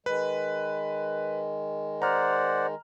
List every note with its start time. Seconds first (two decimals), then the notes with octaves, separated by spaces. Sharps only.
0.06 D#3 G#3 B4
2.02 C5 D5 F#5 A#5 F6